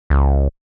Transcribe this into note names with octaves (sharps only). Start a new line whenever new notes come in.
C#2